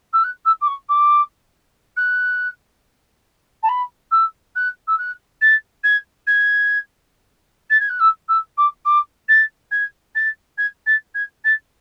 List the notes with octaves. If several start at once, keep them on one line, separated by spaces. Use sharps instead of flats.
E6
F#6
E6
D6
C#6
D6
F#6
A5
B5
E6
F#6
E6
F#6
A6
G#6
G#6
A6
G#6
F#6
E6
E6
D6
D6
A6
G#6
A6
G#6
A6
G#6
A6